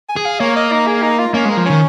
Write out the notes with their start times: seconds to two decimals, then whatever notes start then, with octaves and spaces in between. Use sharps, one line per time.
0.09 G#5
0.16 G#4
0.25 F5
0.40 A#3 C#5
0.56 D#5
0.72 D#4
0.87 G#4
1.02 D#4
1.19 F4
1.34 A#3 C#4
1.45 G#3 A#3
1.57 F3
1.66 D#3 C#4